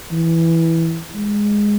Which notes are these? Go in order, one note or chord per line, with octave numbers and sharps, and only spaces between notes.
E3
G#3